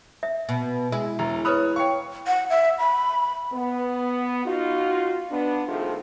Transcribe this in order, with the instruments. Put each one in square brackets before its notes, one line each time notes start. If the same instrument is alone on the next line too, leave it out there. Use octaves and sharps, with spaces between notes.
[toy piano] E5
[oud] B2
[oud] G#3 [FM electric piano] E4
[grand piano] E1 A#5
[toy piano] B4 B5 [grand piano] C#5 D#6 F#6
[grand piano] C#5 C#6 [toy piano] F5 G5
[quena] F#5
E5
B5
[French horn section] B3
D#4 F4 F#4
B3 D4
C3 D#3 F3 A3 F4 G#4